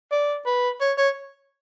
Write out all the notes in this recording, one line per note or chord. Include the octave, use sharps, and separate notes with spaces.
D5
B4
C#5
C#5